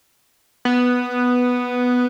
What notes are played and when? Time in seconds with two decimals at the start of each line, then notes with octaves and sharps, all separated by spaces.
0.65 B3